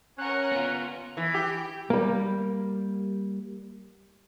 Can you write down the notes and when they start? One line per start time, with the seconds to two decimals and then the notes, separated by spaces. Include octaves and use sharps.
0.18 C#4 A#4 F#5 F#6
0.52 B3 F4
1.17 E3
1.34 G4
1.90 G3 A#3